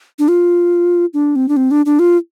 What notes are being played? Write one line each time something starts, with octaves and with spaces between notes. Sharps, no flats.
D4
F4
D4
C4
D4
C4
D4
D4
F4